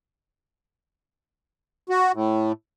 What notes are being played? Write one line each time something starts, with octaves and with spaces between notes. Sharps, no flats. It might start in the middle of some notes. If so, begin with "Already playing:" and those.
F#4
A2